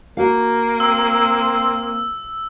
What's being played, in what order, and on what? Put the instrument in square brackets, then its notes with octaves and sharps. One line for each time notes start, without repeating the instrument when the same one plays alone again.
[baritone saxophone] A#3 [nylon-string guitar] F#4 F5
[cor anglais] C4 [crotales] E6